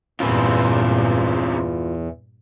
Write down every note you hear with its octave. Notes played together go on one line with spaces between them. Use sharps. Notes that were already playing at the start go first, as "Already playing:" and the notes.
E2 G2 A#2 C#3 C4 F4 B4